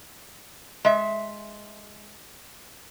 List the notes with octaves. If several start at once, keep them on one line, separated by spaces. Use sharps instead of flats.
G#3 E5